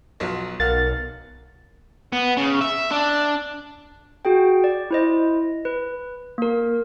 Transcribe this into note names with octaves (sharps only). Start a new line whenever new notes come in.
B1 F3 F#3
B1 A#4 F5 F#5 F6 A6
B3
C#3
E5
D4
F#4 G#4 G5
D5
E4 C5 D#5
B4
A#3 A#4